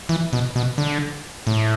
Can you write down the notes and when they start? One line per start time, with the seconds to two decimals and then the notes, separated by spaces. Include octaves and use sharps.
0.09 E3
0.33 B2
0.56 B2
0.78 D3
1.47 A2